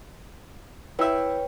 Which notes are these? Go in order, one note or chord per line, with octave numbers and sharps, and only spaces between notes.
E4 B4 C#5 E5 G5